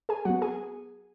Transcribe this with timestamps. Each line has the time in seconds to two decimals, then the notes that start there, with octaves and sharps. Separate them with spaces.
0.09 G#4 G#5
0.25 F#3 B3 F#4 F#5
0.42 G#4 G#5